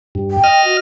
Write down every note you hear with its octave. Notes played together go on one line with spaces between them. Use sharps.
G2
G5
D#5 F6
F#4